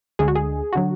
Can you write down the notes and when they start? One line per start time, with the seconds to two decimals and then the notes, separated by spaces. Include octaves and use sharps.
0.19 D2 D3 G#3 G#4
0.28 F#4
0.36 G#4
0.73 D3 F#3 F#4